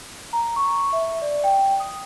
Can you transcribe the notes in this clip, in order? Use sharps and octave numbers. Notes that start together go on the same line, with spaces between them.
A#5
C#6
E5
D5
G5
G5
D#6